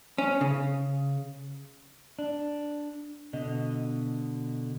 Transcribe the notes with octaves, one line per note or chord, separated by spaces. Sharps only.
C#4
C#3
D4
B2 D3 D#5